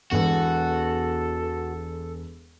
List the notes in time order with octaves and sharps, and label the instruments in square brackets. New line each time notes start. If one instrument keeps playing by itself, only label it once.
[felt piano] E1 E2 [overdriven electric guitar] F#4 [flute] A4